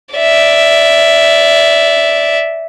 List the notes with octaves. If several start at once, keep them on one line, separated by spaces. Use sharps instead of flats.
D5 E5